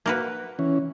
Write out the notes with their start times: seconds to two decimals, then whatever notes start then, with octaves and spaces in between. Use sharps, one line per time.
0.06 A#3 F#4 B4
0.59 E3 C#4